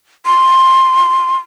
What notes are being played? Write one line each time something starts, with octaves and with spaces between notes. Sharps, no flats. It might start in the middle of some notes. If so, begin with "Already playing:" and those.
C6